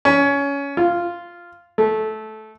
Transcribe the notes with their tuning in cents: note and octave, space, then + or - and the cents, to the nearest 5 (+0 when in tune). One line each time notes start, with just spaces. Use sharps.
C#4 +20
F4 -5
A3 -15